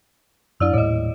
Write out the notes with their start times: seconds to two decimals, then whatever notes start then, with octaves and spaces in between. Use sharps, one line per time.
0.60 F#2 D4 E4 D5 E6
0.73 D#1 A2 C#5 D#5